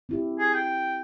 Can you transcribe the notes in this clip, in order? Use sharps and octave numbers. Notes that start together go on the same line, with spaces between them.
C4 E4 G4
G#4
G5